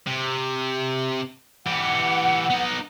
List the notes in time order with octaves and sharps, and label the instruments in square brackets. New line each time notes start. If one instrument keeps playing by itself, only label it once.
[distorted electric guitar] C3
[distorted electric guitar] E3 G4 [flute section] F#5
[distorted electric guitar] B3 D#4